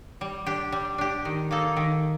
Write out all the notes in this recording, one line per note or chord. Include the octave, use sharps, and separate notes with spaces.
G3
D4 G4
G3
D4 G4
D#3
A#3 D#4 A4
D#3